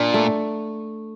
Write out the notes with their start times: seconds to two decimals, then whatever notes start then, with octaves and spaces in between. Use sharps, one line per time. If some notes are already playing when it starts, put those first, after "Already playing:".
Already playing: A#2 D4
0.14 A3